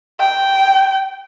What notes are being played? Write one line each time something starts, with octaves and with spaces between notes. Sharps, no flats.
G5